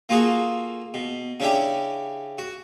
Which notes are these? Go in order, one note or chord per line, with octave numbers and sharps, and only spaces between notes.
A#3 F4 F#4 G#4 A4
B2
C#3 C#4 D4 E4 G4
F#4